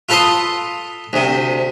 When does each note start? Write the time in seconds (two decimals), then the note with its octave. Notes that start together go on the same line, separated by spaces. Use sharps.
0.09 F4 A4 B4 A5 C6 D#6
1.13 D2 C3